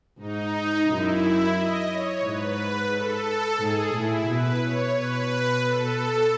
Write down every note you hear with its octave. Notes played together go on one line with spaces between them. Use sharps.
G#2 D#4
F#2 E4
D#5
C#5
G#2 B4
A4
G#2 G#4
A2 E4
B2 B4
C#5
B2 B4
A4